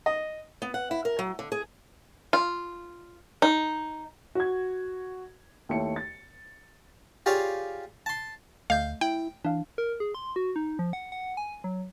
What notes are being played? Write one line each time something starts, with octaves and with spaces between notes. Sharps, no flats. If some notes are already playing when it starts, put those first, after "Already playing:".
D#5
B3
F#5
E4
A#4
F#3
D3
G#4
F4
D#4
F#4 G#6
D#2 A3 E4 C#5 C#7
A6
F4 G4 G#4 C#5 D5 F5
A5 C6
D2 A3 D#5 F5 G6 G#6
E4 G5
E3 D4 F5
A#4
G#4
C6
F#4
D#4
F3
F#5
F#5
G#5
F#3